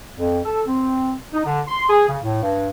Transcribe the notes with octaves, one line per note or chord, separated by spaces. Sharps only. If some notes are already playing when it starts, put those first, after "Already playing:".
F2
A4
C4
D#4
D3
C6
G#4
C#3
A2
G2